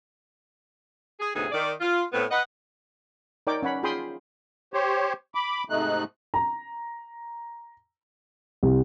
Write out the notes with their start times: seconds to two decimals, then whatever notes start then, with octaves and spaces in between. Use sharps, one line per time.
1.20 G#4
1.35 D2 A2 C3 B3 D#4 G#4
1.52 D#3 D5
1.81 F4
2.13 A2 B3 C4
2.30 B4 D#5 F#5
3.47 D#4 A#4 C#5 D5 G5 D6
3.63 C#4 C#5 F#5 B5
3.83 F4 G#4 G5 B5 C6 D#6
4.74 G4 C5 C#5
5.35 B5 D6
5.70 G#2 C3 A3 D#4 F#6
6.34 A#5
8.63 C2